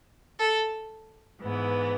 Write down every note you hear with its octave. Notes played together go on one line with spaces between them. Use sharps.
A4
G#2 E3 B3